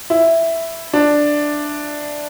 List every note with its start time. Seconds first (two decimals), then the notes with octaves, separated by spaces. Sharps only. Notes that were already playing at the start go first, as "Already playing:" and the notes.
0.10 E4
0.93 D4